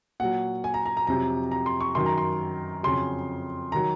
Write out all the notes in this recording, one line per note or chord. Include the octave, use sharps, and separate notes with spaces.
A#2 F#3 F#5
G#5
A#5
A#5
A#5
F2 C3 F#3 A#5
A#5
C6
C#6
F#2 D#3 F#3 C6
A#5
C6
F2 C#3 F#3 C6
D#3 F#3 A#5